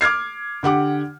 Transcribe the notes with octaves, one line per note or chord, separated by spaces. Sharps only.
D6 F6 G#6 C7
D3 G4 F#5 D6